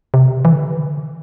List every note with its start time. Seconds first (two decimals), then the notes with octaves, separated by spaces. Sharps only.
0.14 C3
0.45 E3
0.53 D3